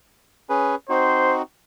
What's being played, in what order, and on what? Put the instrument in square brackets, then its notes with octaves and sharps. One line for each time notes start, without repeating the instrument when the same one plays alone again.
[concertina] C#4 G#4 B4
[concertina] C4 D#4 F#4 [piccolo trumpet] C5